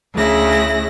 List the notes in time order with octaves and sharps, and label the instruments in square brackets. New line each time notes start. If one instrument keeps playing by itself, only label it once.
[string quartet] D2 C#3 E4 A#6